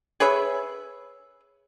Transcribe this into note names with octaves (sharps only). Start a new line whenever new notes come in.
G#4 B4 C#5 E5